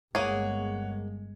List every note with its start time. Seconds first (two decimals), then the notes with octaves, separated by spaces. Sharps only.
0.15 G1 G#3 A#3 G#4 C#5 F#5